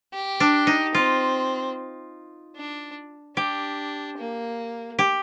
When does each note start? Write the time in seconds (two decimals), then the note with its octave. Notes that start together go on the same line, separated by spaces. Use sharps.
0.13 G4
0.40 D4
0.67 D#4
0.94 C4 F4
2.56 D4
3.37 D4 G4
4.18 A#3
4.99 G4